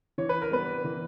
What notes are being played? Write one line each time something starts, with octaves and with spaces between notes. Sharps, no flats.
E3 C#5
B4
A#4
G3 B3 B4
E3